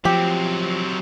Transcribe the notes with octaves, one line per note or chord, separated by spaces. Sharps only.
F3 F#3 C4 G4